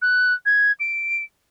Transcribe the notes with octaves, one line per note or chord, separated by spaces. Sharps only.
F#6
G#6
D7